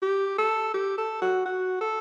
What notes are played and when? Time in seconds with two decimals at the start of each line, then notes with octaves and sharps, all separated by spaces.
0.02 G4
0.38 A4
0.74 G4
0.98 A4
1.21 F#4
1.45 F#4
1.81 A4